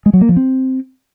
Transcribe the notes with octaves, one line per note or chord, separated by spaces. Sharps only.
G#3
F#3
A#3
F3
C4